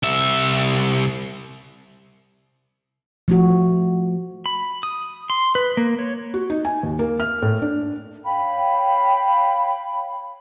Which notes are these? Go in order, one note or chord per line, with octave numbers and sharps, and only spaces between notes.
C2 E5
F3 A3 F#4
B5
D#6
C6
B4
A#3
C#5
F#4
D#4
G#5
D#2
A#3
F6
A2
D4
C#5 F5 G5 B5